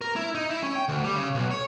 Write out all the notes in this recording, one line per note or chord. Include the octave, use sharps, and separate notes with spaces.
A#4
E4
D#4
E4
C#4
G5
D2
G3
C#3
B1
C#5